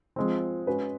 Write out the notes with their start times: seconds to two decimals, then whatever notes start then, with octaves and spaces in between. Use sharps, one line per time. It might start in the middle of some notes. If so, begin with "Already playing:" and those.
0.16 F3 G#3 C4
0.67 G#3 C#4 F#4 B4